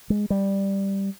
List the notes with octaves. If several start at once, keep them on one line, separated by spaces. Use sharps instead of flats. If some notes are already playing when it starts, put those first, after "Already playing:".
G#3
G3